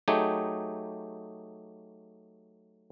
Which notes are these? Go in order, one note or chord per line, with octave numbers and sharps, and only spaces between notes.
F#3 A3 D#4 G4 G#4